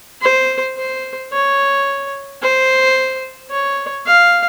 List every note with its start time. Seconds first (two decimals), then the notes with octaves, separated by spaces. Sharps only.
0.22 C5
0.77 C5
1.32 C#5
2.42 C5
3.51 C#5
4.06 F5